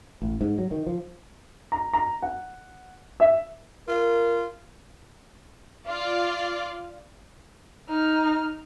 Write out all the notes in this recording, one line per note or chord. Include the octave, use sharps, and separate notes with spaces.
A1
G#2
F#3
D#3
F3
A#5
A#5
F#5
E5
F4 A#4
F4 D5
D#4 F6